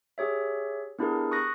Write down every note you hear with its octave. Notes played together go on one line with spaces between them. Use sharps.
G4 G#4 C#5 E5
B3 D4 E4 G4 G#4 A#4
C#6 D#6 F#6 A#6